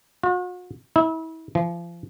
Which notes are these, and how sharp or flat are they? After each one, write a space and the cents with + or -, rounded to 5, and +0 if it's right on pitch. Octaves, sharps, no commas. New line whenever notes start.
F#4 -45
E4 -35
F3 -35